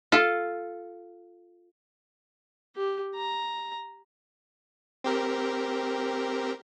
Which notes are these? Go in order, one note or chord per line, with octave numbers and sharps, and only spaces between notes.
F4 A4
G4
A#5
C4 G4 A#4